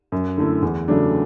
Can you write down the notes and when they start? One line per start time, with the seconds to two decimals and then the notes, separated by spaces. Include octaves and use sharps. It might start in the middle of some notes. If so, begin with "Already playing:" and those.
0.12 F#2
0.38 D3 A3 E4
0.62 E2
0.88 C#3 F#3 A3 D4